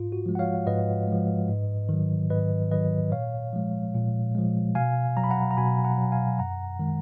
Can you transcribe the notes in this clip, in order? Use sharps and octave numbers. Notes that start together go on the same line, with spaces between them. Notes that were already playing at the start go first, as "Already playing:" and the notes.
Already playing: G#2 F4
F#4
F3 G#3
F#5
C#5 F5
G#2 B4 D#5
F3 G#3
G#2
D#3 F#3
G#2 B4 D#5
D#3 F#3 B4 D#5
A#2 C#5 F5
F3 G#3
A#2
F3 G#3
B2 F5 G#5
F#3 A#5
B5
F#5 A#5
A#5
B2 G#5 B5
F#5 A#5
F#3
F5 G#5
F#2 F#5 A#5
D#3 G#3